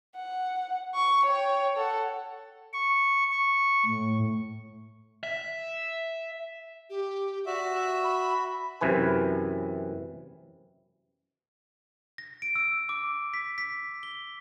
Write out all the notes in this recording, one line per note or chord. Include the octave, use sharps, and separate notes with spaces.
F#5
C#6
C#5 G5
A4 F#5
C#6
C#6
A2
E5
G4
F#4 D5 E5
B5
F#2 C3 E3 B4 G#5
A#6
D7
E6
D6
B6
B6
G7